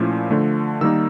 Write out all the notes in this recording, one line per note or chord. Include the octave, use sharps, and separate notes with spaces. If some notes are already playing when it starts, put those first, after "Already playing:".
Already playing: A#2 F3 A3 C#4 E4
D3 F3 A3
D#3 G3 A#3 D#4 E6